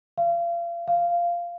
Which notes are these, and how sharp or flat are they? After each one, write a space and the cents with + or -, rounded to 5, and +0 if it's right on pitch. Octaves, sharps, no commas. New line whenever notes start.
F5 -35
F5 -10